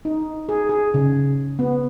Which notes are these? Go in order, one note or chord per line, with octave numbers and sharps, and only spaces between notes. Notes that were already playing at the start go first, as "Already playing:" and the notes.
D#4
G#4
G#4
C#3
B3